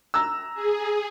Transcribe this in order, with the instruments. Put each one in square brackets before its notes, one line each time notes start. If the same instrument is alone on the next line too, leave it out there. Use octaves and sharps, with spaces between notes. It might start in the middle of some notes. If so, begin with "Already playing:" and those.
[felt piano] A#5 E6
[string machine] G#4